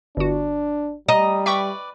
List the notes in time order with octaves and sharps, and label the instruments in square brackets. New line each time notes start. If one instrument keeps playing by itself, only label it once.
[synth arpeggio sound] G1 F#4 [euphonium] D4
[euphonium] G3 [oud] D#5 [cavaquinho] A#5 D#6 [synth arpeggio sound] D#7
[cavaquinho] B4 D5 [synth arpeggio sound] E5 G5 C#6